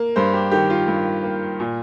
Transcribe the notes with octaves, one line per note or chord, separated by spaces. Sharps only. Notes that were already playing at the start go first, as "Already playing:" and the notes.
Already playing: A#3
G2 C5
G4
D#3 G4
F4
G2
A#3
A#2